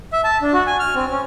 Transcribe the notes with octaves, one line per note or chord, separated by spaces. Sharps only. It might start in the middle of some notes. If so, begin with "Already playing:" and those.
E5
A5
D4
F#4
G#5
F6
C4
C#4